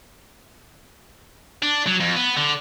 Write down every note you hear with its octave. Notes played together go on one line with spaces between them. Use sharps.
D4
F#3
F2
B3
D3